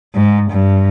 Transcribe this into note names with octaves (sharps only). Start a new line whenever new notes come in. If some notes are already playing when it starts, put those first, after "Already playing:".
G#2
G2